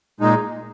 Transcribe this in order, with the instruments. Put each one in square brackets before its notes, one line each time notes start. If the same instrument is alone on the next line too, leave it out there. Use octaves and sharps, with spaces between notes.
[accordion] A#2 G#3 D#4